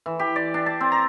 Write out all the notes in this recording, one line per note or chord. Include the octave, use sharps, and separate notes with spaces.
E3
G4
D5
D4
A5
C4
A#5